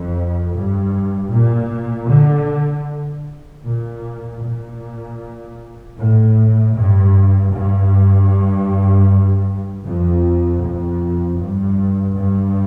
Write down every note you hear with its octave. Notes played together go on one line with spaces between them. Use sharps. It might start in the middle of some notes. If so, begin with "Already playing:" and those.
Already playing: F2
G2
A#2
D3
A#2
A#2
A2
G2
G2
F2
F2
G2
G2